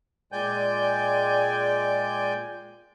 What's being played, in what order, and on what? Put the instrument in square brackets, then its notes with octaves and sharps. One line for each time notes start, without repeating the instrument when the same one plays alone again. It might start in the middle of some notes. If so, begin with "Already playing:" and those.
[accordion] A#2 G#3 D5 G5 G#5 G6